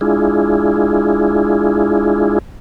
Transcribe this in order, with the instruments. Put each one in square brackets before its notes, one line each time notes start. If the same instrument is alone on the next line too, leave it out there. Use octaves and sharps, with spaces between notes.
[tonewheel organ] G#3 D4 E4 F4 G#4